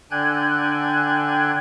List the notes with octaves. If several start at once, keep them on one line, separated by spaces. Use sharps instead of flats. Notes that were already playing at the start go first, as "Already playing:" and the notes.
D3 D4 G5 G#5 F#6 G#6